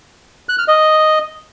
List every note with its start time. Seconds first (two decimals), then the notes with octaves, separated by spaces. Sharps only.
0.49 F#6
0.58 F6
0.68 D#5